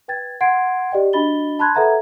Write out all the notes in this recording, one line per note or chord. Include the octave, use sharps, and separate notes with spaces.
B4 G5 G#6 A6
F#5 C6 G#6 C7 D7
G4 D5 D#5 G5
D4 F#4 D#5 B5 A6 G7
A5 B5 C6 F#6 G#6
A4 B4 E5 F#5 A#5 G#6